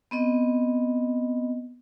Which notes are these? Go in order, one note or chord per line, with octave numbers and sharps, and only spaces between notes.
B3 C4 D#5